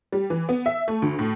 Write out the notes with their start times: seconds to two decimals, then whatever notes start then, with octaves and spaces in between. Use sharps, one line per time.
0.12 G3
0.30 E3
0.49 B3
0.66 E5
0.88 A3
1.02 D2
1.19 A2